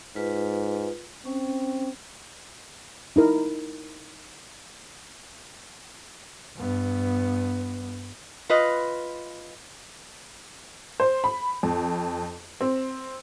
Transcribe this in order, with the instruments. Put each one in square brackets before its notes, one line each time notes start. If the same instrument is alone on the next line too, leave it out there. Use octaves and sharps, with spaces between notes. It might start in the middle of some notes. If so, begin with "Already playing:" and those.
[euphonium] G#2 [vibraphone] F4 B4
[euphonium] C4 [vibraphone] C#4
[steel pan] D#4 E4 A#4
[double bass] G2 B3
[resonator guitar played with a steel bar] F4 B4 D#5
[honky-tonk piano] C5
B5
F2
C4